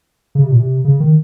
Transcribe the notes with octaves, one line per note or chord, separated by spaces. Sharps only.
C#3
C3
A#2
C3
C#3
D#3